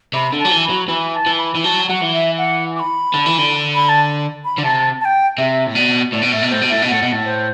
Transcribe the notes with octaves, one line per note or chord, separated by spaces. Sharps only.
C3 B5
D3
A5
F#3
E3
B5
F#3
E3 B5
A5
E3
B5
E3
F#3 A5
F#3 F#5
E3
E5
F#5
D6
B5
D3
E3
D3
B5
A5
B5
D3
C3 A5
A5
G5
C3 E5
A2
B2 D5
A2 D5
B2
A2 E5
B2
A2 C5
B2
A2 E5
B2
A2 F#5
B2
A2
C5